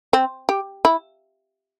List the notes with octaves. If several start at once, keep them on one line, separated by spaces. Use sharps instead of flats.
C4
G4
E4